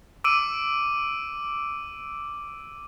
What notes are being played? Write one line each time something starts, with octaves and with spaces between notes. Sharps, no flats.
D6 E6 D7 D#7